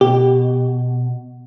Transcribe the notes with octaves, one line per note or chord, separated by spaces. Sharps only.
B2 G4